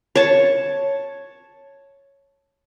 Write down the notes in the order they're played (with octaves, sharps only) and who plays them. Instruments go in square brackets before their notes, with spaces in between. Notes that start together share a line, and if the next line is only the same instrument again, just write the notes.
[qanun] C#5 A5